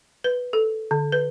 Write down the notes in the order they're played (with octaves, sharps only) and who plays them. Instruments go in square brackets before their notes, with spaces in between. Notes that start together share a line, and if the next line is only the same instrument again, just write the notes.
[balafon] B4
A4
D3
B4